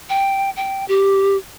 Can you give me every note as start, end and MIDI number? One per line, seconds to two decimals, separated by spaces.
0.09 0.50 79
0.56 0.87 79
0.88 1.37 67